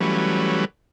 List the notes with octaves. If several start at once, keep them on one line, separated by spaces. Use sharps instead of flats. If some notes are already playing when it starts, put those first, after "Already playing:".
E3 F#3 G3 A3 C#4 B4